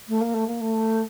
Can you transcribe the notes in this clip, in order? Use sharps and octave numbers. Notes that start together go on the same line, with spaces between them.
A3
A#3
A3
A#3
A3